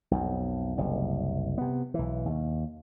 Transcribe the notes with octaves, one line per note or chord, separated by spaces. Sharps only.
B1 F2
F#1 C2
C3 B3
B1 E3
D#2